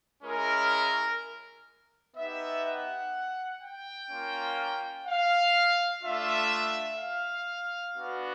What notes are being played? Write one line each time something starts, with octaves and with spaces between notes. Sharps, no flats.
G#3 C#4 E4 A#4
B3 D#4 G4 E5
F#5
G5
A#3 C#4 F4
F5
A3 D4 F4 E5
F5
B3 D4 F#4